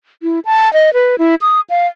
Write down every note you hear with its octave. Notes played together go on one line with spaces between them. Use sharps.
E4
A5
D#5
B4
E4
D#6
F5